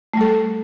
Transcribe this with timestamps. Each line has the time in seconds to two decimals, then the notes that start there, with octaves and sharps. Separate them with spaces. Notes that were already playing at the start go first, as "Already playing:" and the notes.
0.14 A3
0.17 G3
0.21 A4